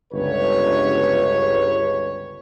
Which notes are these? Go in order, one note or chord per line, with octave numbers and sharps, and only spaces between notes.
G1 C#2 B4 C#5